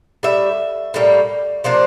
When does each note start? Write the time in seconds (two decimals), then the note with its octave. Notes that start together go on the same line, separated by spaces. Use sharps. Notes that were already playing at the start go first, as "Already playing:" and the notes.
0.23 A2 G3 E5
0.94 A2 G3 A#3
1.64 C3 F3 A#3 D4